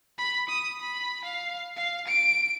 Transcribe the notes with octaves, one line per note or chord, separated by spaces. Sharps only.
B5
D#6
B5
F5
F5
D7